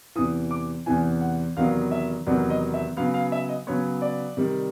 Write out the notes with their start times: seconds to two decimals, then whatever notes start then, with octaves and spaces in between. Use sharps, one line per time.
0.16 E2 C3 E3 D#6
0.51 D6
0.86 E2 C3 E3 G#5
1.21 F#5
1.56 E2 C3 D#3 F#3 B3 F5
1.91 E5
2.26 E2 C3 D#3 F#3 B3 D5
2.50 D#5
2.74 E5
2.97 C#3 F#3 B3 F5
3.14 F5
3.32 E5
3.49 D#5
3.67 C#3 F#3 B3 C#5
4.02 D5
4.37 C3 D#3 G3